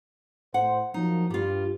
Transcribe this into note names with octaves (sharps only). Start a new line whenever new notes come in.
A2 C5 F#5
F3 F#3 A#3 D#4
G2 G3 F4